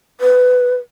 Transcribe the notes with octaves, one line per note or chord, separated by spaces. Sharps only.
B4